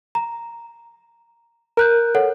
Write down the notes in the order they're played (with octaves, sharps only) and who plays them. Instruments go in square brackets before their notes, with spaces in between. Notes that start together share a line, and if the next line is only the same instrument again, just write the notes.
[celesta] A#5
[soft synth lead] A#4 [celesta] A#5 F#6 G6
[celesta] A4 C#5 F#5